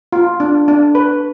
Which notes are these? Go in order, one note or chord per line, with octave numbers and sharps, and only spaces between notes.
F4
D4
D4
B4